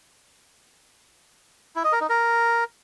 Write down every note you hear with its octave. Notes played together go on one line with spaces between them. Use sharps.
E4
D#5
A#4
D#4
A#4